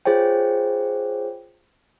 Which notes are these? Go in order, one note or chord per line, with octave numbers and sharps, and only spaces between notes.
F4 G#4 C5 C#5 G5